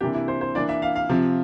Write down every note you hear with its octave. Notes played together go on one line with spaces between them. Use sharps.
C3 E3 A#3 D4 G4
E4
C5
C5
E3 A#3 D4 D5
E5
F5
F5
C3 F3 C4